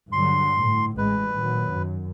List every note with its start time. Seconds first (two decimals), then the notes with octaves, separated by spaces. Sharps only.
0.12 G2 D3 F#3 C6
0.56 A2
0.98 A1 G#3 B4
1.38 A#2 D#3 F#3
1.71 F#2